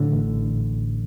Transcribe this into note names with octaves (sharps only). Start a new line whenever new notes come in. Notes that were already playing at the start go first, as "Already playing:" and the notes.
Already playing: A2 D3
A1